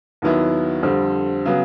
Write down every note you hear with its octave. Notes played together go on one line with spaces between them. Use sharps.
D#2 D#3 F#3 B3 E4
F2 D3 G3 C4
C#3 F#3 B3